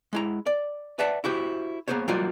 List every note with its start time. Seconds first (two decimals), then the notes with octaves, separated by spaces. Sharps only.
0.13 G#3 E4 A#5
0.46 D5
0.99 B4 D5 E5 F#5 A5
1.24 E4 F#4 G4 C5
1.88 A#3 B3 G#4 C5 C#5
2.08 F#3 G3 A#3 D#4 F4 F#4